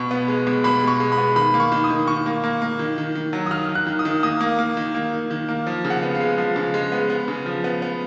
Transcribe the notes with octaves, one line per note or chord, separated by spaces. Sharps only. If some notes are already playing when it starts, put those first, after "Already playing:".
Already playing: B2 C#6
B3
G#3
B2
B2 B5
G#3
C#6
G#3
B5
B3
D#3 B5
A#3
C#6
D#3
D#6
D#3
D#3 C#6
A#3
A#3
A#3
D#3
D#3
D#3
F#3
D#6
D#3 F6
D#3
F#6
D#3
D#6
D#3
A#3 D#6
A#3
A#3
D#3
A#3
D#3
D#3
A#3
F3
C#3
F#5
B3
F5
G#3
F3 F5
C#3
G#3
B3
B3
C#3
F3
B3
B3